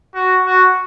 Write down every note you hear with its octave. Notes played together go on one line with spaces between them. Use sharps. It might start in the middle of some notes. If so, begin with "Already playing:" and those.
F#4
F#4